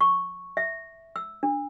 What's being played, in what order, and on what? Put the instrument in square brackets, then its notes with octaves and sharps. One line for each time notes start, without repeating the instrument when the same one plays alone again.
[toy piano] C#6
E5
E6
D4